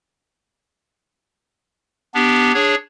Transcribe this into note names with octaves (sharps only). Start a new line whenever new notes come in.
B3 D4 G4
D4 G#4 C#5